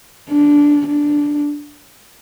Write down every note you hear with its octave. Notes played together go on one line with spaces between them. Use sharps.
D4
D4